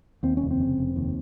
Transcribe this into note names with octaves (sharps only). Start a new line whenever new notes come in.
D#2 C4
F1 C#4
C4
C#3
F1
D#2